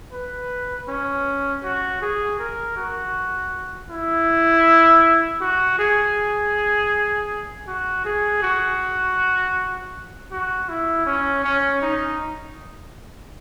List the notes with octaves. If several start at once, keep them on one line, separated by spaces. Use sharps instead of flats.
B4
C#4
F#4
G#4
A#4
F#4
E4
F#4
G#4
F#4
G#4
F#4
F#4
E4
C#4
C#4
D#4